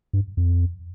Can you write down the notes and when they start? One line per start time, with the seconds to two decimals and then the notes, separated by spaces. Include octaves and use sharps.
0.13 G2
0.37 F2